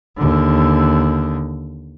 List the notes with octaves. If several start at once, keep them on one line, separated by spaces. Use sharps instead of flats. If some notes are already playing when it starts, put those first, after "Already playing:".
D#2 D3